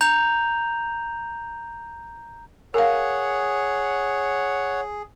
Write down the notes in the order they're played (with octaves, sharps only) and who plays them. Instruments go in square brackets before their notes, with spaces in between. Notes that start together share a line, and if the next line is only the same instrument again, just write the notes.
[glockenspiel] A#5 G6 F7
[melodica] G#4 [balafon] A#4 F5 [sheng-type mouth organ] C#5 F#5